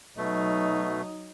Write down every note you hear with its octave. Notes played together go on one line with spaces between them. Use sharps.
B2 F#3 A3 D#4